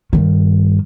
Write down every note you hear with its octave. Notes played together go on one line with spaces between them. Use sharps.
G2 D#3